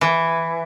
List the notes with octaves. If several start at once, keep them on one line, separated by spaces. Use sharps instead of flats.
E3